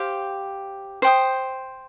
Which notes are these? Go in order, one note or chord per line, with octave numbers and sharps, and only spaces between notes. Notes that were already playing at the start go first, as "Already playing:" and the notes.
Already playing: G4 C5 F5
C5 G5 D#6